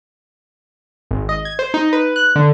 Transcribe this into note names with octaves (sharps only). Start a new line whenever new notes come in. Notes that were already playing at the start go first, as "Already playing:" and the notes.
G#1
D#5
G#6
C5
D#4
B4
F#6
D3